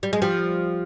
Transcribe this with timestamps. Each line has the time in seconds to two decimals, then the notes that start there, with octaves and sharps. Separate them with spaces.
0.03 G3
0.13 G#3
0.22 F3 G3